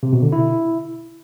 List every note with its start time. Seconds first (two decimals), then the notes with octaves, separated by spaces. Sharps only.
0.03 C3
0.13 B2
0.23 D3
0.32 E4